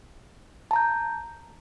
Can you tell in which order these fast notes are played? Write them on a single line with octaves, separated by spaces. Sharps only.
A5 A#5 G6